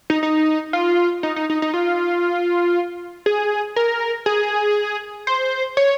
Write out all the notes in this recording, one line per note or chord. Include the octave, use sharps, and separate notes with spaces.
D#4
D#4
F4
D#4
D#4
D#4
D#4
F4
G#4
A#4
G#4
C5
C#5